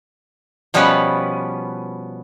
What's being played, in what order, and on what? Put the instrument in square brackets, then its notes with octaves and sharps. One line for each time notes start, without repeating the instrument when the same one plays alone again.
[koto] B2 F3 G3 B3 C#4 B4